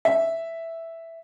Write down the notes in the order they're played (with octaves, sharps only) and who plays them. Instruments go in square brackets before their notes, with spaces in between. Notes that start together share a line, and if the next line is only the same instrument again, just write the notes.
[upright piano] E5